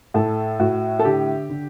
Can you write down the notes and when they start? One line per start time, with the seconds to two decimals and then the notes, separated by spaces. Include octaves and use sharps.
0.14 A2 A4
0.60 A2 F#4
0.99 A4
1.05 D3 G4
1.50 D3